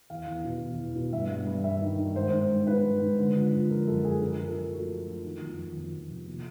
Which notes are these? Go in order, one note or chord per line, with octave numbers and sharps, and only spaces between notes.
E2 F5
E2
B2
E2
E2
B2
G2 E5
G2
G2
G2 E5
D#3
D#3
G#2 C5
G#2
G#2
G#2 B4
G#2
G#2
D3
F3
F3
F3 A#4
F#2 A4
F#2 G#4
F3 A#4
F3
A4
F3
A2 F#4
F3
F3
D#3
F2
F2
F2
F2
C3
A#2